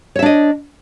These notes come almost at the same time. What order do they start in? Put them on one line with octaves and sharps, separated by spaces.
C#5 E5 D4 D#5